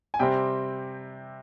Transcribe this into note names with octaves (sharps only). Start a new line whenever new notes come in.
G#5
C3 G3 C4 G5